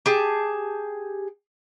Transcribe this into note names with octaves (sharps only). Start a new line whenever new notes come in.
G4 G#4 A5